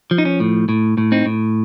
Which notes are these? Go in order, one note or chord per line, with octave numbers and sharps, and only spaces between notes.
F3
D#4
C#4
A2
A2
A2
C4 D#4
A2